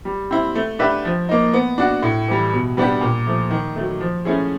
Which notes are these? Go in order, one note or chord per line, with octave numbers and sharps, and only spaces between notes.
G3
C4 E4
A3
D4 G4 B4 E5
F3
A#3 D#4
B3
D4 F#4
A2
E3 G3
B2
G3 B3 D4 G4
A#2
F3 A3
D#3
F#3 A3
F3
A3 C#4 E4 G#4